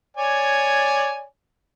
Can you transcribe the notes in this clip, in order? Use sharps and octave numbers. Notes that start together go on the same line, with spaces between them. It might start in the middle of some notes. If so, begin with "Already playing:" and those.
C#5 D5 G#5